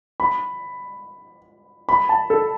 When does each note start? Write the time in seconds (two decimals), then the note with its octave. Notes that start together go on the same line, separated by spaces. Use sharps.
0.20 B5
1.89 B5
2.09 A5
2.30 A4